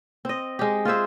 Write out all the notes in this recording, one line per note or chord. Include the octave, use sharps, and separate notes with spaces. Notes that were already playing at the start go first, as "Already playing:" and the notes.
C4 D#5
G#3 G4
F4 G#4 C5 E5